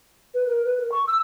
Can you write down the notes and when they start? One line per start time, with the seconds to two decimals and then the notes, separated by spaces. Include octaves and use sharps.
0.34 B4
0.46 A#4
0.65 B4
0.78 A#4
0.91 C#6
1.07 E6